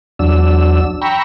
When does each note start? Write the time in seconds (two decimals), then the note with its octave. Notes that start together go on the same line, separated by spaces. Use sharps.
0.19 E2 F#3 D4 E6
1.02 G5 A#5 B5 C#6 E6